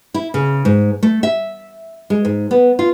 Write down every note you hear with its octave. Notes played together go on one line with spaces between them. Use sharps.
E4
C#3
G#2
A3
E5
G#3
G#2
B3
F4